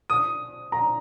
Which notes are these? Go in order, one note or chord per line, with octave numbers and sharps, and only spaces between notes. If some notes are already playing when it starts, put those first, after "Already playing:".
D#6
A#5